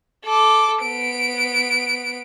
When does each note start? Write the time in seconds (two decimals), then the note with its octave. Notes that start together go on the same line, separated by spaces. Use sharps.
0.25 A4 D6
0.81 B3 D7